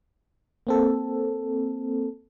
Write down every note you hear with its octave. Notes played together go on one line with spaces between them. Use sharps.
A#3 C4 A4